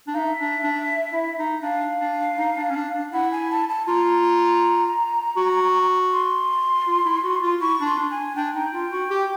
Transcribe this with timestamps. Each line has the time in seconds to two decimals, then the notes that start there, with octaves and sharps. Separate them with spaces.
0.07 D4
0.14 D#4 E5 F5
0.39 D4
0.63 D4
1.13 E4
1.39 D#4
1.63 D4 F5
2.00 D4
2.38 D#4
2.57 D4
2.70 C#4
2.76 D4
2.94 D4
3.13 E4 F#5
3.32 G#5
3.51 A5
3.69 A5
3.87 F4 A#5
5.37 F#4
6.12 C6
6.87 F4
7.05 E4
7.23 F#4
7.42 F4
7.61 E4 C#6
7.81 D4
7.86 C6
7.98 D4
8.11 G#5
8.36 D4 G5
8.45 G#5
8.54 D#4 G5
8.73 F4
8.92 F#4
9.10 G4